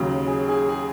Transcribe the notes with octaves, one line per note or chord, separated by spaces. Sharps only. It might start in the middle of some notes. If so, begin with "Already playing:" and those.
Already playing: D#2 C#3 F#3
G#4
G#4
G#4